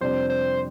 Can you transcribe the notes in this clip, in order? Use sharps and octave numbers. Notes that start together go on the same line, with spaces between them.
F2 C3 G3 D4 C5
C5